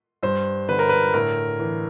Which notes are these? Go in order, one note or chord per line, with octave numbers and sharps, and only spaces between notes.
G2 C5
D3 B4
A#4
B4
A2 A#4
E3